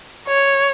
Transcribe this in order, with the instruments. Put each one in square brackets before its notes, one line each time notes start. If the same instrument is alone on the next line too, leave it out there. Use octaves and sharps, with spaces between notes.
[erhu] C#5